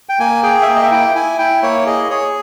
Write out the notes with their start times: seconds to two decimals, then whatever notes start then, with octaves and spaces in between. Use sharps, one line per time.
0.09 G5
0.19 A#3 G#5
0.43 G#4 G5
0.62 E5
0.67 A#3 G5
0.76 D#5
0.83 E5
0.91 E4 G5
1.15 E4 G#5
1.38 E4 G5
1.62 A#3 C#5
1.86 G#4 D#5
2.10 G#4 C#5